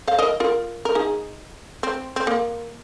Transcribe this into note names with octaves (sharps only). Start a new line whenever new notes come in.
C5 F5
A#4 D#5
F4 A#4
A#4
D#4 G#4
C4
C4
A#3